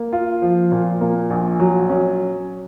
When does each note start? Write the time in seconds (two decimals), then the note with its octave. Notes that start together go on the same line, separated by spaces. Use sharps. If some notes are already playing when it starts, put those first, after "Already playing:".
Already playing: A#3
0.13 F4
0.42 F3
0.72 A#2
1.01 A#3
1.30 A#1
1.60 F#3
1.89 C#4